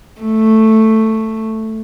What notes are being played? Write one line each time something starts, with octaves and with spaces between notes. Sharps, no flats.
A3